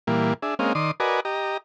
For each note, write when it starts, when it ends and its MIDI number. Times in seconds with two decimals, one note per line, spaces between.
0.07 0.34 46
0.07 0.34 52
0.07 0.34 55
0.07 0.34 58
0.42 0.54 62
0.42 0.54 68
0.42 0.54 76
0.59 0.73 56
0.59 0.73 58
0.59 0.73 60
0.59 0.73 61
0.59 0.73 75
0.59 0.73 77
0.75 0.91 51
0.75 0.91 74
0.75 0.91 84
0.75 0.91 87
1.00 1.20 66
1.00 1.20 70
1.00 1.20 71
1.00 1.20 74
1.00 1.20 75
1.00 1.20 80
1.25 1.57 67
1.25 1.57 75
1.25 1.57 82